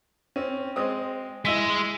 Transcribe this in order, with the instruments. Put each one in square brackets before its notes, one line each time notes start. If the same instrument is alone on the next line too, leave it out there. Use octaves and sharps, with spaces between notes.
[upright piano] C4 C#4
G#3 C4 D#6
[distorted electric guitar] G#3 [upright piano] E4 E6 B6